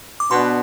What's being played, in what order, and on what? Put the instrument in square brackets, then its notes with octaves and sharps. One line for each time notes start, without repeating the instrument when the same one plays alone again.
[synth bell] D6
[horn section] B2 B3 D4 [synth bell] C6